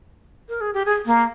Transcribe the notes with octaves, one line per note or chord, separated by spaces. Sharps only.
A#4
G#4
G4
G#4
A#3